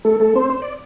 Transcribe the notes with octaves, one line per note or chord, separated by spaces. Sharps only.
A3 A4
A3 A4
C4 C5
C5
D5